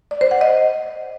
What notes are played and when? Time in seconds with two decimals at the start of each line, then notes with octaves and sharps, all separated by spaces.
0.11 D5
0.21 C5
0.31 F#5
0.41 D#5